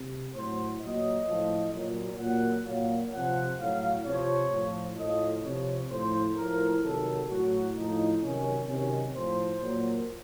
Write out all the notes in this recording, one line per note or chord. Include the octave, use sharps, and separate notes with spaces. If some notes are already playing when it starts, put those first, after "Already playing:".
Already playing: C3
A2 F#3 C5
A#2 F#3 D#5
A2 F3
A#2 F#3
A#2 F#3 F#5
A#2 F#3 F5
C3 F3 F#5
A2 F#3 F5
C3 F3 C#5
A2 F3
A2 F3 D#5
C3 F3 C#5
A2 F3 C5
A2 F3 A#4
C3 D#3 F#3 A4
A2 F#3 F#4
A2 F3 D#4
C3 D#3 F#3 C#4
C3 D#3 F#3 C#4
A2 F3 C5
A#2 F#3